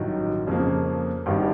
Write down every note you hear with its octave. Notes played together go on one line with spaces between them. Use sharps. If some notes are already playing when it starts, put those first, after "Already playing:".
Already playing: A1 G2 D#3 F#3
F2 C#3 F3 A#3
G#1 G2 D#3 G3